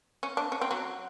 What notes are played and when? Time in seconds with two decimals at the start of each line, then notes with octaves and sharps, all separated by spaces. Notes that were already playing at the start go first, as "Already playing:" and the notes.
0.23 C#4
0.37 D4
0.52 C#4
0.61 C4
0.71 F#3